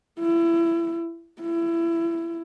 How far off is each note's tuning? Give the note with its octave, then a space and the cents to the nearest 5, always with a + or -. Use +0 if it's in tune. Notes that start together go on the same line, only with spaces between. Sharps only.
E4 +25
E4 +25